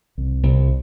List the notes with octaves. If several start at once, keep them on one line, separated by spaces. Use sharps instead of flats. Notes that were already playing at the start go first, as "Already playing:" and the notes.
C2
C2